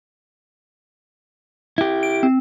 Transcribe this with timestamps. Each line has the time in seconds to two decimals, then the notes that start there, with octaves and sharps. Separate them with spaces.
1.78 E4 G4
2.03 D7
2.23 C4